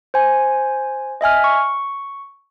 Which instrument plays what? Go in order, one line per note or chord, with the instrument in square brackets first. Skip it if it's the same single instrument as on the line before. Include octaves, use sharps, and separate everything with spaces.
[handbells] C5 G#5
D#5 E5 G#5 F6
C#6